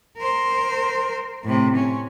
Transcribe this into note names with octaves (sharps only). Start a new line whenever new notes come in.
A#4 C5
A2 C3
C#4